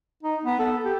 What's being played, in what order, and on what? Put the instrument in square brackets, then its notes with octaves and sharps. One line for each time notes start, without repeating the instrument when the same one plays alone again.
[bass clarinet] D#4
B3
A4
G4